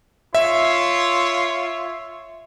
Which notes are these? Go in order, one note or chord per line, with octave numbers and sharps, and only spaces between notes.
F4 C#5 E5